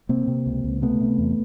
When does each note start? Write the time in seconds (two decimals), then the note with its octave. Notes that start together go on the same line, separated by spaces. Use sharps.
0.09 C3 A#3 C4
0.28 C3
0.46 C#2
0.64 C#2
0.82 C3 A3 B3
1.00 C3
1.19 E2